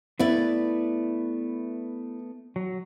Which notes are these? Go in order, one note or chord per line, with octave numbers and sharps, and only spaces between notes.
A3 B3 E4 B4 D5
F#3